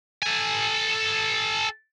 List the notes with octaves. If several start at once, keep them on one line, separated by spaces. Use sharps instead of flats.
A4 G#5